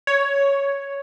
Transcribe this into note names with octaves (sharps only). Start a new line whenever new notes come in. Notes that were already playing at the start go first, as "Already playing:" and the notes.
C#5